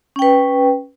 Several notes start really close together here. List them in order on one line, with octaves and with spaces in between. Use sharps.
C#4 G5 B4